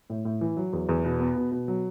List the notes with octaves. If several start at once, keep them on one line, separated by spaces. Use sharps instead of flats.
A2
A2
E3
F#3
E2
E2
B2
B3
B2
B2
F#3